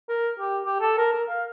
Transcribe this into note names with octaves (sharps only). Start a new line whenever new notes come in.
A#4
G4
G4
A4
A#4
A#4
F5